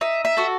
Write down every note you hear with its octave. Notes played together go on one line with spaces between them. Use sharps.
D#4 E5
E5
F#4 A4